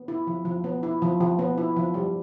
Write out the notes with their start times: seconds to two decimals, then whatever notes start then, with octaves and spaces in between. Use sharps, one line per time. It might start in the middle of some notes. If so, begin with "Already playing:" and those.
Already playing: B3
0.08 E4
0.27 F3
0.45 F3
0.64 B3
0.83 E4
1.02 F3
1.21 F3
1.39 B3
1.58 E4
1.76 F3
1.94 G3